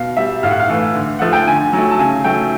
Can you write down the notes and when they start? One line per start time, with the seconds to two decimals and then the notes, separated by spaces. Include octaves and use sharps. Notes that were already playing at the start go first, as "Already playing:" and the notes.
Already playing: B2 F5
0.17 G3 E5
0.43 A2 F5
0.51 F#5
0.60 F5
0.69 E3 A3
0.95 D3
1.19 F3 A3 F#5
1.33 G5
1.47 D3 G#5
1.73 F#3 A3
1.91 A5
1.99 C#3 G#5
2.24 F#3 A3 G5